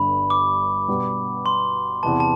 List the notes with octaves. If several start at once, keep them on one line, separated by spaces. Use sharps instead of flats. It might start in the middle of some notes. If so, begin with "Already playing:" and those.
Already playing: G1 G2 D3 G3 B5
D6
B2 G3 B3
C6
E2 C3 E3 B3 A5
A5